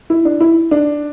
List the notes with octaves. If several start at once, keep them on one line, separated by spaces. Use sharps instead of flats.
E4
D4
E4
D4